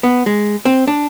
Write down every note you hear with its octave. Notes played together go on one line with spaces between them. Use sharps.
B3
G#3
C4
D4